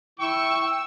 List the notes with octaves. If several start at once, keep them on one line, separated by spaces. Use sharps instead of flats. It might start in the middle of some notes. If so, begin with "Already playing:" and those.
E4 G5 C#6 E6